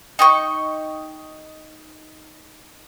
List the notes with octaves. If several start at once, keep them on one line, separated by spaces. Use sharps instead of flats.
D#4 G5 C#6